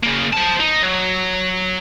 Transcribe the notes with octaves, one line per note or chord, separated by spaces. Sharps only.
C#3 A#3
C5 A5
D#4
F#3